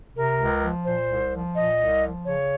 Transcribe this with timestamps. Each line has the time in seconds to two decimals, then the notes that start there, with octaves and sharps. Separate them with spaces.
0.15 C3 A#4
0.39 C#2
0.62 F3
0.86 A#2 C5
1.08 C2
1.33 F3
1.55 A#2 D#5
1.78 C2
2.02 F3
2.26 C#3 C#5